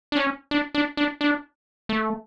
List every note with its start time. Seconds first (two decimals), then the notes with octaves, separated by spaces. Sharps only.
0.12 D4
0.16 C#4
0.51 D4
0.74 D4
0.97 D4
1.21 D4
1.89 A3